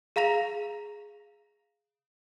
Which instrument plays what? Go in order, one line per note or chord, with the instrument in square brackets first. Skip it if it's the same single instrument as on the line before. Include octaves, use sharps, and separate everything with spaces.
[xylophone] G#4 F5 A#5 A#6 F7